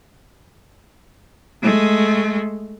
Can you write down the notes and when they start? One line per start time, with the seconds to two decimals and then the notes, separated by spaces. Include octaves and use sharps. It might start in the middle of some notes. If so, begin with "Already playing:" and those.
1.63 G#3 A3